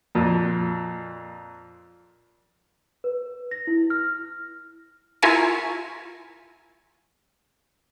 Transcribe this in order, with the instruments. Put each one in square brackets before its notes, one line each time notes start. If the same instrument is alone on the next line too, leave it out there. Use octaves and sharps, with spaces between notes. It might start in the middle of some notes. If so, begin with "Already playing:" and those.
[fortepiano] F2 A#2
[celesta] B4
A#6
E4
F6
[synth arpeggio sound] E4 F4 A#4 E5 G#5 C#6